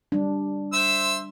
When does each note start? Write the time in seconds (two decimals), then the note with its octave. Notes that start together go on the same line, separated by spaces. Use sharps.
0.12 G3 D4
0.73 C5 E5 E6